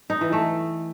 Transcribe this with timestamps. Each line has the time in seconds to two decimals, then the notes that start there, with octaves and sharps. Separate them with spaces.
0.10 D#4
0.21 E3
0.32 A3